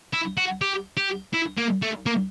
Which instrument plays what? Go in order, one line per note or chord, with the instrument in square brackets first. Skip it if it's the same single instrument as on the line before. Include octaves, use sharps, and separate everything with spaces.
[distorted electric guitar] E4
F#4
G4
G4
E4
A#3
A3
A#3